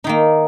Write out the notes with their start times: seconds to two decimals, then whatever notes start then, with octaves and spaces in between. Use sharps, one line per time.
0.04 D#4
0.07 D#3
0.09 A#3